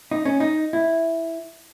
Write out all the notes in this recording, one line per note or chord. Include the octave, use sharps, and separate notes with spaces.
D#4
C#4
D#4
E4